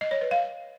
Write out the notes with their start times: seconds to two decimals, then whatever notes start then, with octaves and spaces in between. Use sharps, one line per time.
0.01 D#5
0.11 C#5
0.21 B4
0.31 F5